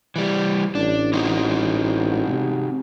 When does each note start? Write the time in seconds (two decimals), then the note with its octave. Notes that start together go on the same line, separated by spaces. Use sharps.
0.16 E3 G3
0.75 A1 D4
1.13 C4 D#4 F#4
2.27 C3